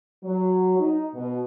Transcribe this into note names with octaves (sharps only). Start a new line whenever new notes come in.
F#3
D#4
B2